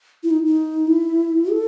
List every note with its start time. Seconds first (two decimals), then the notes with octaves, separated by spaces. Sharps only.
0.23 E4
0.31 D#4
0.46 D#4
0.87 E4
1.51 A4